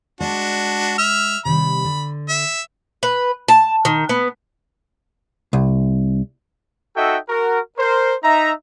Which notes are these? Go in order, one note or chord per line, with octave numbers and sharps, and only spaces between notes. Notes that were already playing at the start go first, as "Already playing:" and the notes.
G#3 D4 F#4 D5 A5
E5 F6
C3 D#3 G3 B5
D3
E5
B4
A5
D#3
B3
C2
D#4 F#4 A4 D#5 E5 G5
F#4 A#4
A#4 C5
D#4 E5 A#5